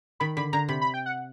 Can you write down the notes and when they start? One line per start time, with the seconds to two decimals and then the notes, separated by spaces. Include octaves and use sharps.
0.20 D#3 B5
0.37 D3 B5
0.53 D3 A#5
0.69 C3 B5
0.81 B5
0.94 G5
1.06 F#5